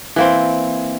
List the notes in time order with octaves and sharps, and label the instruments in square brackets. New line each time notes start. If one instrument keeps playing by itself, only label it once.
[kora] E3 A#3 C4